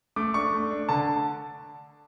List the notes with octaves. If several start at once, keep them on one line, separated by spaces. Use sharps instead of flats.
A3 D6
D4 C#6
A3
D4
D3 A5